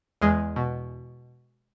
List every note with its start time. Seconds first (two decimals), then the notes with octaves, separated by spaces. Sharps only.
0.21 E2 G#3
0.56 B2